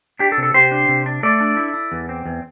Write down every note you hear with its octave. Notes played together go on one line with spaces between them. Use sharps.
D4 G4
A4
C3
A4
C3 G4 C5
D4
C3
D4
A3 A4 D5
D4
E4
E4
E2
C4
E2